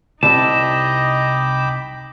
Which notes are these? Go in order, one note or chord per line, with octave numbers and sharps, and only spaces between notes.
C2 C3 D#4 D#5 G5 A5 B5 D6